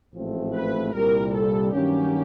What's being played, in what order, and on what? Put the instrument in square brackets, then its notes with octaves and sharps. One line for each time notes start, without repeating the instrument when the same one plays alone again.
[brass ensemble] A1 G#2 F3 A3 C4
[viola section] B4
[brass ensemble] C2 A#2 G3 [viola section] A#4
[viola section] A4
[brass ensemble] G2 D#3 F#3 A#3 C#4 [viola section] G4